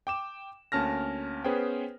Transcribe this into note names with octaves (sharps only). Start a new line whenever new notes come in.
G5 D6 E7
D2 A#3 C#4 A5 F6 A#6
B3 C#4 G#4 B4 C5 G5